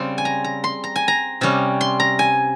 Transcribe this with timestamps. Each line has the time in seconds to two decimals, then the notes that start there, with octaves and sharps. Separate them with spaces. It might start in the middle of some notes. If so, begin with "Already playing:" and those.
Already playing: C#3 G3 C4 C6
0.18 G#5
0.25 A#5
0.44 A#5
0.64 C6
0.84 A#5
0.96 G#5
1.08 A#5
1.41 C3 G3 C#4
1.81 C6
2.00 A#5
2.19 G#5